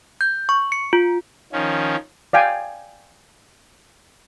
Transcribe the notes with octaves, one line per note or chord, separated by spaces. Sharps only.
G6
C#6
C#7
F4
D#3 F3 C#4
D5 F5 G5 G#5